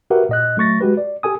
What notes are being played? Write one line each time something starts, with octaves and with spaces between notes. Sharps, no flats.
F#4 G4 A#4 B4 E5 F#5
A#2 D#5 F#6
F#3 A3 C#6 A6 A#6
G#3 F#4 G4 B4
D5
G4 A4 G#5 D#6